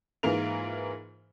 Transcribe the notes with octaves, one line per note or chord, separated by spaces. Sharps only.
G#2 E3 A#3 F4 A#4 F7